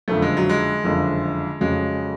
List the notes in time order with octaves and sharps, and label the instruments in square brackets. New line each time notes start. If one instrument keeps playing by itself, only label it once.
[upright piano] F#1 F2 D3 F3 [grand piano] A3
[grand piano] G#3
F#3
G#3
[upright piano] F#1 F2 D3 F3
[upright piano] F1 F2 C#3 F#3 C#4 [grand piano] G#3